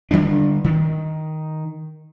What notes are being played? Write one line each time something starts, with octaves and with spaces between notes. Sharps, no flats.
D3 F3 G3 D4
D#3